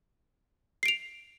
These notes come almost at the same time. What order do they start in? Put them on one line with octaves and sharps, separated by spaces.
C7 D7 F7